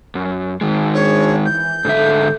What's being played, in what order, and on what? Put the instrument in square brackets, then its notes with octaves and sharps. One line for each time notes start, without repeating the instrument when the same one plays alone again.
[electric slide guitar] F#2
D#3 G#3
[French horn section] D4 G#4 C5 [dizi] C#5
[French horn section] E3 [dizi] G6
[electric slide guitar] G#2 D3 E5 [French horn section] A4